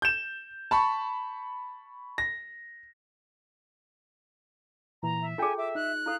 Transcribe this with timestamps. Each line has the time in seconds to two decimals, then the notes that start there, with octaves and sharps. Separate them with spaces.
0.02 G6 E7
0.71 A5 B5 C#6
2.18 A#6
5.03 A#2 E3 A#5
5.22 E5
5.38 F4 G#4 A4 G5 G#5
5.58 E5 D6
5.75 D#4 F#6
6.06 E4 A4 F5